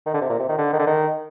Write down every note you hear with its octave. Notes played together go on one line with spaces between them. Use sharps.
D#3
D3
C3
A#2
C3
D#3
D3
D#3
D3
D#3